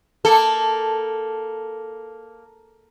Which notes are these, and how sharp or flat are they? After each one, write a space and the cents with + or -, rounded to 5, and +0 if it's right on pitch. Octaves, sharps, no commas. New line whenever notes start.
A#3 +0 A4 +0